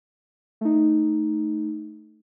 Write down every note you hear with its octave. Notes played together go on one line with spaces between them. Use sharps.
A3 D#4